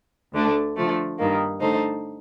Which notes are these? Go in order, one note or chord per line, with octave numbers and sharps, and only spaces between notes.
D2 D3 A3 D4
D3 F3 A3
G2 D#3 A#3
D3 A3 D#4 A4 C5